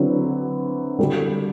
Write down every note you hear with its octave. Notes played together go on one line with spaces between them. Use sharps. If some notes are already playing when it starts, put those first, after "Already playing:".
Already playing: D3 F#3 C4 E4 B4
D3 G3 D4 F#4 A4